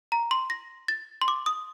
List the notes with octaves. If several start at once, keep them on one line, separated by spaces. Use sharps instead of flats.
A#5
C6
A#6
A6
C6
D6
D#6